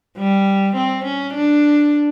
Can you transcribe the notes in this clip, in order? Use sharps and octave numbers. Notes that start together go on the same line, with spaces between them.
G3
C4
C#4
D4